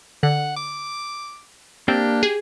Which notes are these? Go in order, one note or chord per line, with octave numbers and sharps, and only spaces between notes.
D3 F#5
D6
A#3 C4 D4 G4
G#4